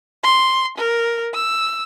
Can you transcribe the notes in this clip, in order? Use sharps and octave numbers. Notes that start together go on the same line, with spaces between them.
C6
A#4
E6